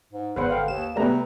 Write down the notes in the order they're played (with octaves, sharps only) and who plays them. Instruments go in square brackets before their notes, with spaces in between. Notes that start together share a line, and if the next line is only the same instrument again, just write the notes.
[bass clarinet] G#2
[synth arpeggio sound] G#1 [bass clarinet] E2 [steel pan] B4 C5 F#5
[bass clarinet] D3 [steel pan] F5 G5
[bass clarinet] D#2 [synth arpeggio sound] E7
[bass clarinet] C3 [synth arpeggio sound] G3 A3 B3 [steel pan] G#4 B4 A#5